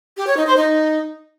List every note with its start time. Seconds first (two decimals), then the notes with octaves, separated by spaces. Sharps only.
0.17 G4
0.27 C#5
0.37 D#4
0.47 C5
0.57 D#4